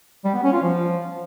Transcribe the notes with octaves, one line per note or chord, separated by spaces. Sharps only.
G3
B3
C#4
F4
F3